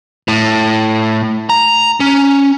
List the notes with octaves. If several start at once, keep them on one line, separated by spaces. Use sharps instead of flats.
A2
A#5
C#4